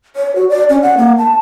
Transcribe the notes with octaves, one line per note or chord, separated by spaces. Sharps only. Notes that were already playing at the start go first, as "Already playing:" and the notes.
C#5
F#4
D5
C#4
F#5
A#3
A5